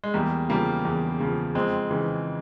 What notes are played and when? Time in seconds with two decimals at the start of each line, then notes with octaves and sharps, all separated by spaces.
0.04 G#3
0.14 E2 G3 A#3
0.49 C#3 F3 G3 A#3
0.85 E2
1.20 C#3 F3
1.55 F2 G#3 C4
1.90 C#3 E3